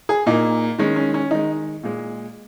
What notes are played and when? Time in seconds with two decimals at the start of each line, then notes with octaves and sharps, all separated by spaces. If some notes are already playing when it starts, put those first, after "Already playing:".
0.09 G#4
0.26 A#2 A#3 D#4
0.79 D#3 G#3 C#4
0.96 C#4
1.14 C#4
1.31 D#3 G#3 D#4
1.83 A#2 G#3